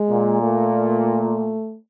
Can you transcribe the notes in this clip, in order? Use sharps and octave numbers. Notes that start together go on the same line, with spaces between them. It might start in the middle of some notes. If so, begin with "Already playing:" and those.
Already playing: G#3
A#2
A3